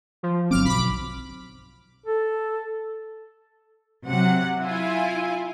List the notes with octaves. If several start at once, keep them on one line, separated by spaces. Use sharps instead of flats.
F3
G1 F#3 C4 D6 F6
B1 B5 D6
A4
C3 F#3 F#5
E4 F4 G#5